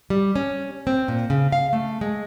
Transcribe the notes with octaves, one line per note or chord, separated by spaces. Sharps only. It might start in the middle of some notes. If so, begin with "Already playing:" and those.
G3
C#4
C4
A#2
C#3
F5
A3
G#3